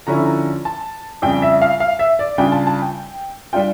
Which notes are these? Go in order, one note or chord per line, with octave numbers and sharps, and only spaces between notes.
D3 F3 C#4 E4 A#5
A#5
A5
F2 C#3 G3 G5
E5
F5
F5
E5
D5
C#3 G3 D4 F4 G5
A5
A5
G5
G3 D4 F4 G5